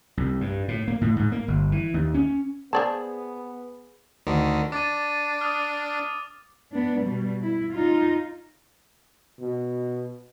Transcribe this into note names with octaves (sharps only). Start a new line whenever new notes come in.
C2
G2
A2
A#3
A2
G#2
A#3
G1
E3
D#2
C#4
B3 G#4 C5 D5 A5
D2 D3 D#3
D4 D6 A6 D#7
D#6 F6
B3 D4
B2 G3
E4
D#4 F4
B2